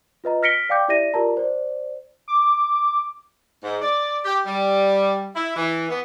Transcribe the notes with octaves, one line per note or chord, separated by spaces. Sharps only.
F4 B4 D#5 A#5
F6 A#6 B6 C#7 D7 G7
D5 F5 G5 D6 G6
E4 G4 D5 E5 A#6 D#7
F4 G4 A#4 D5 A5 A#5
C5 D5
D6
G#2
D5
G4
G3
E4
E3
B3